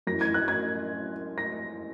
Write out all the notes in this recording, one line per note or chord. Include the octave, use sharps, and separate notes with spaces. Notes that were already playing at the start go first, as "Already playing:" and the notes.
F#2 E3 A#6
G#6
F#6
G#6
A#6